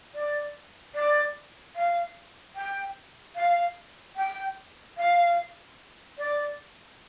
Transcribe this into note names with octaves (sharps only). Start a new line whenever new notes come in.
D5
D5
F5
G5
F5
G5
F5
D5